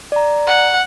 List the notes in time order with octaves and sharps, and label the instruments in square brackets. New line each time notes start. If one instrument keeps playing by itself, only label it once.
[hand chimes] D5 A#5
[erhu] F#5